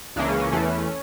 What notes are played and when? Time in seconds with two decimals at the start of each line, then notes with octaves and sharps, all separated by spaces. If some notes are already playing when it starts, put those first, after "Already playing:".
0.16 C#2 C#3 E3 A#3 D4
0.28 C#4
0.40 C#4
0.52 E2 E3 A3